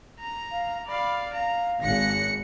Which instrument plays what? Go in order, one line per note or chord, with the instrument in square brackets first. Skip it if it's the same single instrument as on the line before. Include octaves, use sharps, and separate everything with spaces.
[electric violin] A#5
[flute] F5
[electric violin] D5 F5 [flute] B5
[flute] F5 [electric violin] A#5
[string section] G#1 C#7 [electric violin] F#6 A#6